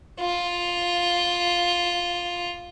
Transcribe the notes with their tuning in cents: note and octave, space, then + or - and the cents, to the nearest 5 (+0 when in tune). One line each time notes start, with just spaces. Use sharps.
F4 +5